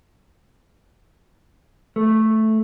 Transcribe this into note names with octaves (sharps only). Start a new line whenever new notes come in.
A3